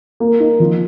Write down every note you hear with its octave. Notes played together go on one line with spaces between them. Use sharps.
A#3
D#4
F3